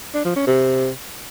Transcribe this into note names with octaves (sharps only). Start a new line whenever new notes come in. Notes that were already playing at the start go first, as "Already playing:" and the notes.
D4
F3
C#4
C3